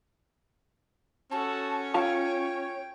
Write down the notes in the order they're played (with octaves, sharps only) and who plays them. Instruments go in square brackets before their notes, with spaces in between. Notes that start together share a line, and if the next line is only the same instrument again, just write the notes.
[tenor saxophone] C#4 [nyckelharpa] F#4 A4 [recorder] A5
[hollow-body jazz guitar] F4 F5 A5 [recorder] C#5 [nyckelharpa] G5